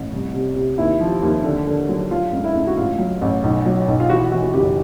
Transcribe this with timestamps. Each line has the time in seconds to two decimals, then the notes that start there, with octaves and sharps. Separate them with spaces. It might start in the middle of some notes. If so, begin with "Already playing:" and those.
Already playing: A1
0.12 C2
0.34 C3
0.56 C3
0.78 D#2 E4
1.01 F3
1.22 D#2
1.44 D3
1.67 D3
1.89 F#3
2.11 F#3 F4
2.33 C#2
2.44 E4
2.55 C#2
2.67 F#4
2.77 A1 F4
2.99 F#3
3.21 A1
3.44 B1
3.66 F#3
3.88 B1
4.00 F4
4.09 E3 F#4
4.31 E3 F#4
4.43 F#4
4.54 F#1 G4